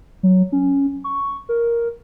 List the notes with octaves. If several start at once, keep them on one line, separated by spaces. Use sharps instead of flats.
F#3
C#4
C#6
A#4